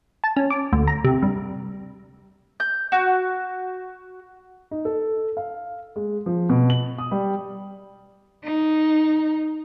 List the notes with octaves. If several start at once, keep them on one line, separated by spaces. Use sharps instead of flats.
A5
C#4
D6
D2
A#5
C3
G2
G6
F#4
D#4
A4
F5
G#3
F3
B2
F#7
D#6
G3
D#4